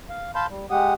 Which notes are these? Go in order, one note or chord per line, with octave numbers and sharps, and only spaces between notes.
F5
F5 A5 B5 C6 G6
G3
G#3 G4 F#5 D#6